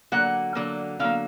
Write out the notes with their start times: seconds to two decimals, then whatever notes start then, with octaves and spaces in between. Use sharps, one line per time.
0.12 D3 F#3 A#3 F#5
0.55 D3 F#3 A#3
1.00 D3 F#3 A#3 F5